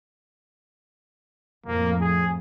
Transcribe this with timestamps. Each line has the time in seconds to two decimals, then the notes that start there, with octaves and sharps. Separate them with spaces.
1.66 F2 A2 F3 A#3
2.01 G#4